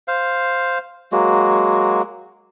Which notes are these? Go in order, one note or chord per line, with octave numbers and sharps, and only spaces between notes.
C5 F5
F#3 G#3 A#3 F#4